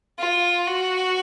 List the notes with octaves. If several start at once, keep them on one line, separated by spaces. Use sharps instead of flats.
F4
F#4